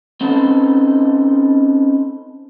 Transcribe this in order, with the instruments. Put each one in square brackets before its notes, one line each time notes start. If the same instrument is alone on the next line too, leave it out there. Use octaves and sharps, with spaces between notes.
[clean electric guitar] C4 C#4 D#4 A4 B4